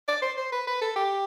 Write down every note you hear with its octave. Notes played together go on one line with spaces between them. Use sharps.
D5
C5
C5
B4
B4
A4
G4